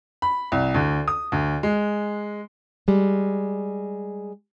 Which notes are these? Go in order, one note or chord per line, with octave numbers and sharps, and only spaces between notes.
B5
C2
D2
D#6
D2
G#3
G3 G#3